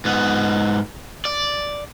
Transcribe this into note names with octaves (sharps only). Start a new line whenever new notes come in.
G#2 B3
D5